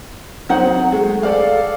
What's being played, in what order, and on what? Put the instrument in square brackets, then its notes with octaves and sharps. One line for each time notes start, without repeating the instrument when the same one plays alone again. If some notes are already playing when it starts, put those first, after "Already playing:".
[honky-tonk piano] F#3 C4 [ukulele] D#4 C5 F#5
[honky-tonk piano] G#3 A3
A4 D5 F5